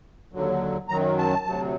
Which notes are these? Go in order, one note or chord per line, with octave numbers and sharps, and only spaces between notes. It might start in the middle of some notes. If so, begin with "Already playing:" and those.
D#2 D3 F#3
F#2 D#3 F#3 A#5
A5
D2 C3 F#3